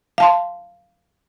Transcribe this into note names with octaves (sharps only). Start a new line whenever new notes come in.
F5 A5 C6